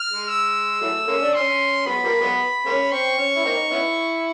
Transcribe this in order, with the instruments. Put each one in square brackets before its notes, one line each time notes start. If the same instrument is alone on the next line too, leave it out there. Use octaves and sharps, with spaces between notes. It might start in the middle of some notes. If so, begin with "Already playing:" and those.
Already playing: [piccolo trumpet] F6
[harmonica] G#3
[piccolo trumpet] E6
[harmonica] E3 F#3 A3
G#3 A#3 C#4
D4
[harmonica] C#4 [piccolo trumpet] C6
[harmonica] F#3 G#3 B3 [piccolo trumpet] B5
[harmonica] F3 G3 A#3
F#3 G#3 B3
G#3 A#3 C#4
[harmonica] C4 [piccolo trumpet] C#6
[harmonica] C#4
E4
A#3 C4 D#4
B3 C#4 E4